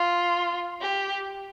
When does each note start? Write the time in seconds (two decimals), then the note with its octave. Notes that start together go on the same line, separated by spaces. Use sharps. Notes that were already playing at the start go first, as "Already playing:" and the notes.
Already playing: F4
0.80 G4